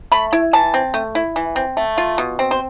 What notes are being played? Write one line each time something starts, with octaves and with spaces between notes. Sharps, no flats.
A3 B5
E4
E3 A5
C4
A3
E4
E3
C4
A3
F4
B2
C4
C5